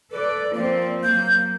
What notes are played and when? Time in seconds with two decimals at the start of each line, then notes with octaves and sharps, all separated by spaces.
0.11 A4 B4 D5
0.53 F3 A#3 C4 D5
1.03 F#3 A#3 G6